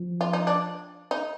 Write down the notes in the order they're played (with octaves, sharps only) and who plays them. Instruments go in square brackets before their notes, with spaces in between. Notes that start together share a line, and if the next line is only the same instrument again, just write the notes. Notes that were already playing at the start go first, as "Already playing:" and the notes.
Already playing: [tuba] F3
[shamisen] F4
D#4
D4
D#4